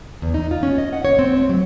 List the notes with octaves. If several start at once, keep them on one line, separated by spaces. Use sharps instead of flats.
E2
D#4
F4
C#4
D#5
F#5
C#5
C4
A3
F#3